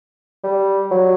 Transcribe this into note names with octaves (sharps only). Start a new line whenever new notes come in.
G3
F#3